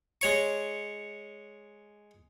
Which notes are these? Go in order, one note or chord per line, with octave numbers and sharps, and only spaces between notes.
G#3 C#5 C#6